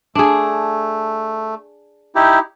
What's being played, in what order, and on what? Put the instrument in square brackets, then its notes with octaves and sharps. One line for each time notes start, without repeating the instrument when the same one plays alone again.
[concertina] A3 [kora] D4 G#4
[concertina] D#4 E4 G4